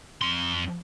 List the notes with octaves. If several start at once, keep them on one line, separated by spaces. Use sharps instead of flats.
F2 C6